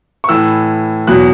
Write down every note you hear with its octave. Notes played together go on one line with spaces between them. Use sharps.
C#6
A2 E3 E6
E2 B2 F#3 F#6